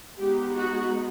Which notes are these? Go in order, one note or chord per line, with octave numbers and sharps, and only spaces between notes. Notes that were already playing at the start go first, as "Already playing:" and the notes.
G#3 B3 D#4 G4
F#4